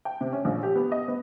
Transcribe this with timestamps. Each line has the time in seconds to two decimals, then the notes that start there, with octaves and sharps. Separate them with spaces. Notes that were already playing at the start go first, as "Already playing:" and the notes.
0.05 G5
0.21 C3
0.33 C#4
0.45 A#1
0.63 G4
0.76 B3
0.92 D#5
1.08 B3